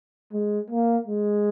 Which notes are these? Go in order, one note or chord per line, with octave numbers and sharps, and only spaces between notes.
G#3
A#3
G#3